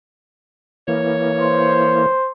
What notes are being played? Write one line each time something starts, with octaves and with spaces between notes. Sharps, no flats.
E3 A#3 C#5
C5